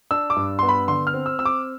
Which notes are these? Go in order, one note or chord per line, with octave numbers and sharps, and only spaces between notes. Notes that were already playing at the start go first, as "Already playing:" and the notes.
D4 E6
D6
G2
B3 C6
B5
D3 C6
F6
C4
E6
C4 E6
D6